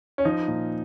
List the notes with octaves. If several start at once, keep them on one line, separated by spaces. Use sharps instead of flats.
C#4
F3 D#4
A#2